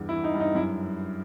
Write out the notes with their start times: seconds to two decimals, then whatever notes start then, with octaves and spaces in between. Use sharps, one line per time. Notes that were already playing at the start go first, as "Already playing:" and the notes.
Already playing: E2 G2
0.09 E4
0.14 E3
0.24 D#4
0.34 G2
0.40 D#4
0.55 F#2 E4